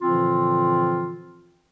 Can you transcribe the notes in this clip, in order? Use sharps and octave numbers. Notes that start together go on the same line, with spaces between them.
A#2 D3 E3 F3 C4 F4